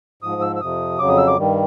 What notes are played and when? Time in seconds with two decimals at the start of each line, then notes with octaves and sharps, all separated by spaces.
0.22 G#2 F3 D#6
0.42 E6
0.56 E6
0.61 F2 C3 F3 D#6
0.99 F2 C#3 F#3 D6
1.08 D#6
1.18 E6
1.27 D6
1.37 G2 D#3 G3